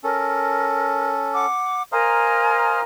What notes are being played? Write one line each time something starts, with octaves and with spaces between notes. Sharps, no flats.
C#4 A4 A#4
F#5 D6
A#4 C5 D#5 F5 G#5 A#5